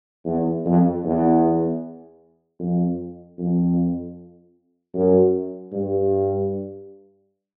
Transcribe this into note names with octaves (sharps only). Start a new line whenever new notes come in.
E2
F2
E2
F2
F2
F#2
G2